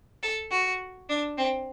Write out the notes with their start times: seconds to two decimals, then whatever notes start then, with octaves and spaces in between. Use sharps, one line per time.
0.22 A4
0.51 F#4
1.09 D4
1.37 C4